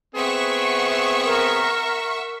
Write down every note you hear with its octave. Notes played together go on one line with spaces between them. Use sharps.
B3 C4 G#4 E5 F#5 C#6
A#4